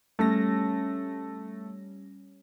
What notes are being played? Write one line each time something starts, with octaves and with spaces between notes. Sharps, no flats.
G3 A3 C#4 A#6